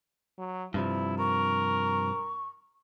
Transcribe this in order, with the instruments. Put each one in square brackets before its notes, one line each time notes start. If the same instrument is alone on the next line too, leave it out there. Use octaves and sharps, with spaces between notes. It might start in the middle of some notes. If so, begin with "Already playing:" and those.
[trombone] F#3
[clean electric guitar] G2 C3 F3 [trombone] E4
[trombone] A#4 [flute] C#6